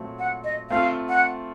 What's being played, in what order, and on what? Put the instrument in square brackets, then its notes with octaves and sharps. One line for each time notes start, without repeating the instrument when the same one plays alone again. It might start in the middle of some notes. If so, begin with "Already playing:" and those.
Already playing: [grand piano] A#2 F#3 A3 C4
[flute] F#5
D#5
[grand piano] A3 C4 F4 [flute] F5
[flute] F#5